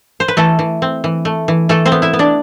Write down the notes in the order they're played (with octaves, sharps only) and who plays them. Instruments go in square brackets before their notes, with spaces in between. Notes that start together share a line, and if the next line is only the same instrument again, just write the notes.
[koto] C5
B4
E3 A3 A4
E3
C4
E3
A3
E3
E3 A3 A4
C4 C5
B3
E4 E5
B3
D4 D5